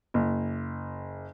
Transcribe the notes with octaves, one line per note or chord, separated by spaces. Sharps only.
F#1